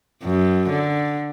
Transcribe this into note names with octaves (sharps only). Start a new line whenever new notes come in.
F#2
D3